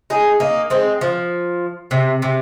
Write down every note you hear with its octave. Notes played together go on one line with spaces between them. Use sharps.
D#4 G#4
A#3 D#4
G#3 C4
F3
C3
C3